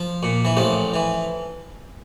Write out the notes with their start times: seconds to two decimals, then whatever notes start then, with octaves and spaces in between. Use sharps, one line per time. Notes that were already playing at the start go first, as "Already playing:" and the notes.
Already playing: F3
0.23 A#2
0.45 E3
0.57 A1 F3
0.94 E3